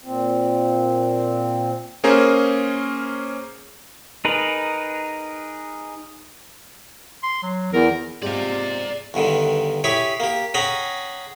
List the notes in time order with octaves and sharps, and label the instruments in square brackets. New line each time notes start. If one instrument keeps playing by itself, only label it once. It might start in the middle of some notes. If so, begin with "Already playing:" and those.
[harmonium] A#2 C4
[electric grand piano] A#3 C#4 G#4 A#4 C5
[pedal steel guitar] D#4 G#4 A#4 B4
[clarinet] C6
F#3
[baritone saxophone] E2 [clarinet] A#4
[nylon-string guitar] G#2 F4 [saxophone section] C3 [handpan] G#4 [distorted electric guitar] D5 A#5
[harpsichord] E2 G2 D3 D#3
E4 G4 G#4 C#5 B5 D6
A#3 G4
C#4 G#4 F#5 G5 A#5 B5